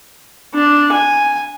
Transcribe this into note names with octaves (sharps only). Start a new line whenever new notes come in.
D4
G#5